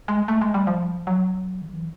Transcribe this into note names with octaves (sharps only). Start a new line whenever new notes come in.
G#3
A3
G#3
G3
F3
F#3
D#3
E3